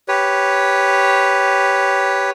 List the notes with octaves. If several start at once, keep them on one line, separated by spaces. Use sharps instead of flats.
G4 B4 C#5